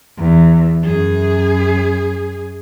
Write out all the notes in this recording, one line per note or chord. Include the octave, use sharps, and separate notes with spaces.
E2
F#2 G#4